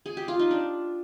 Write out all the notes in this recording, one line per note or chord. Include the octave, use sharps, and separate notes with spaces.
G#4
G4
F4
D#4
D4